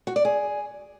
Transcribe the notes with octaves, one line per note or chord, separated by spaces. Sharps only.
F#4
D5
G#4